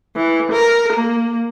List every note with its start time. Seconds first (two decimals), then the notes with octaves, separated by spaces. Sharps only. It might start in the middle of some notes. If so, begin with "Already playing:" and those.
0.16 E3
0.52 A#4
0.93 A#3